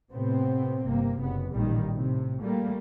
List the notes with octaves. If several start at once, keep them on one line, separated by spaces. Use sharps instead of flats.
A2 C3 B3 C4
G1 C3 A#3
F#1 B3
A1 A#2 D#3 G3
A2 C3
G3 A3 A#3